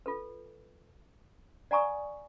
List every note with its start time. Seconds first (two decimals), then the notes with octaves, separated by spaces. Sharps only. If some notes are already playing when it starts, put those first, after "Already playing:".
0.06 F4 A4 B4
1.71 D5 F#5 G#5 A#5 C#6 D#6